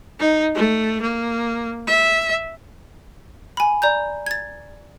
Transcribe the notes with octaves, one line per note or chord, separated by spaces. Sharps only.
D#4
A3
A#3
E5
G#5 B5
D5 A#5 G6
G#6 A6